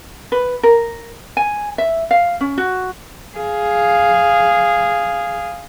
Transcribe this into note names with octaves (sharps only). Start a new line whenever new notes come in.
B4
A#4
G#5
E5
F5
C#4
F#4
G#4 F5